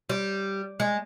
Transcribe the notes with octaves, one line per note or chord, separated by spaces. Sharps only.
G3
G#3